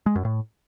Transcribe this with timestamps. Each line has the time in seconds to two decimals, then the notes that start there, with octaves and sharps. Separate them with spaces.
0.06 G#3
0.15 F#2
0.25 A2